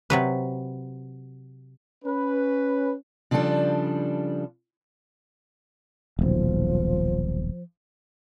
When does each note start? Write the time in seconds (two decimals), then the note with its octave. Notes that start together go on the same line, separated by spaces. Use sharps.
0.10 C3 F#3 B4
2.05 C#4 B4
3.31 C#3 F3 G3 D4 A4
6.19 D#1 B1 F3